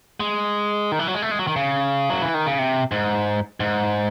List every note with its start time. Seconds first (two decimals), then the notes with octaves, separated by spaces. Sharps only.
0.20 G#3
0.92 D#3
0.99 E3
1.07 F#3
1.14 G#3
1.22 A3
1.31 G#3
1.39 F#3
1.47 D#3
1.56 C#3
2.10 F#3
2.22 E3
2.34 D#3
2.46 C#3
2.59 C3
2.91 G#2
3.60 G#2